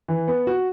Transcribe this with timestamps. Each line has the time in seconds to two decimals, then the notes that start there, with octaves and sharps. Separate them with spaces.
0.08 E3
0.28 B3
0.47 F#4